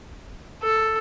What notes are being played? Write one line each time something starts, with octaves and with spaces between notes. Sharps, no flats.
A4